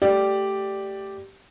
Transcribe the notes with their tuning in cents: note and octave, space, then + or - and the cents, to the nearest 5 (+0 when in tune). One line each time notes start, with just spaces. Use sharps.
A3 +0 G4 -5 D5 +0